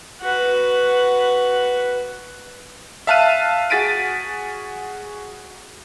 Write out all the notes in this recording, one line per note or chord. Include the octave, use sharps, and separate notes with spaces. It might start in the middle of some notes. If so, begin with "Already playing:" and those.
F#4 B4
E5 F5 A5 F6 F#6 D#7
F#4 G#4 A6 B6 D7 D#7